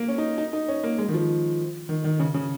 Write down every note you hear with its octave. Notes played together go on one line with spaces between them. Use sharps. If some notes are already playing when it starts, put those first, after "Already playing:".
Already playing: A#3
C#4
D#4
D#4
D#4
C#4
A#3
G#3
D#3
F3
D#3
D#3
C#3
C#3